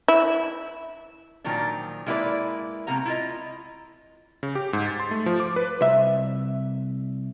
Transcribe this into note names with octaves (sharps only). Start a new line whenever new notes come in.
E4
A#2 D#3 F3 F#3 D4
G#3 A#3 E4 G4 B4 D5
A2 C3 A#3 B3 A#5
E4 F4 D#5
C#3
G4
G#2
A6
C6
A3
F3
D6
B4
C2 E5